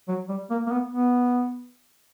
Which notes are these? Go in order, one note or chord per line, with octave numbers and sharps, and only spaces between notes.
F#3
G3
A#3
A#3
B3
B3